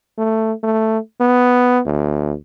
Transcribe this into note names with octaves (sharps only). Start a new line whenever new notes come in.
A3
A3
B3
D2